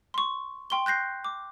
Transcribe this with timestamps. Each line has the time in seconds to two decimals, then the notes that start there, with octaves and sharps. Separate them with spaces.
0.14 C6 C#6
0.70 G5 C6 C#6 G7
0.86 F#6 G6 A#6 C7
1.24 D6